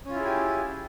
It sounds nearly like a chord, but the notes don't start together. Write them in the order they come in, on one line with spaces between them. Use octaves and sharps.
C#4 F4 E4 G#4 G4